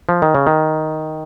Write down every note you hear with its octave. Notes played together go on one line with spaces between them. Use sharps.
F3
D#3
C#3
D#3